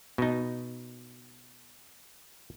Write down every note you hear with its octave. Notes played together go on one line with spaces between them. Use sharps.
B2 D#4